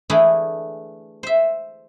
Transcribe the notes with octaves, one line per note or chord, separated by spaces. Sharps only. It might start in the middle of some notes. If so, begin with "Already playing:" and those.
E3 A3 D4 E4 G#4
C5 E5